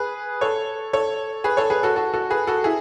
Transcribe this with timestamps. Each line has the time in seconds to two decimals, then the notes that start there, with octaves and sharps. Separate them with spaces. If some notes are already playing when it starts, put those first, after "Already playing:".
Already playing: G#4 B4
0.41 A4 C#5
0.93 A4 C#5
1.44 G#4 B4
1.57 A4 C#5
1.70 G#4 B4
1.83 F#4 A4
1.96 F#4 A4
2.14 F#4 A4
2.30 G#4 B4
2.47 F#4 A4
2.64 E4 G#4